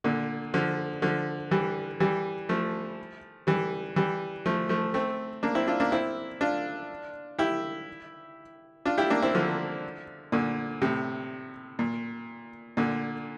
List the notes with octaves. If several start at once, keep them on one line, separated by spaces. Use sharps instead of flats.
A#2 D3
D3 F3
D3 F3
E3 G3
E3 G3
F3 A3
E3 G3
E3 G3
F3 A3
F3 A3
A3 C4
A#3 D4
C4 E4
D4 F4
A#3 D4
C4 E4
D4 F4
E4 G4
D4 F4
E4 G4
A#3 D4
C4 E4
D3 F3
A#2 D3
A2 C3
A#2
A#2 D3